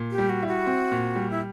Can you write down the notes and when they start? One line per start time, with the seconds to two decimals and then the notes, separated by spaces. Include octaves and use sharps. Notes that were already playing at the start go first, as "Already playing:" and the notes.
Already playing: A#2
0.11 G4
0.18 G3
0.29 F#4
0.42 E4
0.48 F#4
0.66 C4
0.92 A#2
1.15 G3
1.30 E4